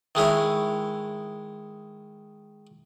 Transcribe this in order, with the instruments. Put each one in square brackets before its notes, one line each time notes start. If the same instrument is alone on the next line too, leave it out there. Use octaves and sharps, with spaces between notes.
[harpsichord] D#3 G#3 E4 C#5